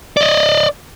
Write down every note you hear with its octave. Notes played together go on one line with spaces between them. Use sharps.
D5 D#5